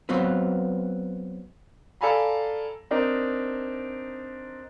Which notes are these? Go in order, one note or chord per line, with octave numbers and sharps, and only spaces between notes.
F#3 B3 C4 F4 B4
A4 D5 F5 G#5 A#5 B5
C4 D4 D#4 A#4